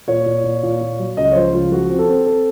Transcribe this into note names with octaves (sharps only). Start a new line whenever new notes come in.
A#2 C#5
A#2
A#2
A#2
A#2
F#3
C#2 D#5
C#5
F3 C5
C#2 F4
F3 F#4
C4
A4
C4
C4 A4